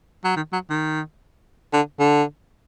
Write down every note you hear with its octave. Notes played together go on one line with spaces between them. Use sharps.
F#3
D#3
F#3
D#3
D3
D3